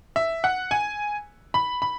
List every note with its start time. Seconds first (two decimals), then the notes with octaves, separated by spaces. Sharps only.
0.16 E5
0.44 F#5
0.71 G#5
1.54 B5
1.82 B5